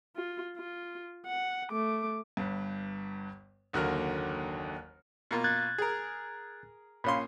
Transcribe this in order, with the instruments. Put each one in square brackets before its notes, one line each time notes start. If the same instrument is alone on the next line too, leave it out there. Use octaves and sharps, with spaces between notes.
[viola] F4
F4
F#5
A3 D6
[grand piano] G1 G2
F#1 D#2 D3 F#4 A#4 F6
[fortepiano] B2 A#3 F4
[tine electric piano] F#6 G#6 A6
[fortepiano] G#4 A#4
[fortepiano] A#1 C#4 C6 [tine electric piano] F5 B5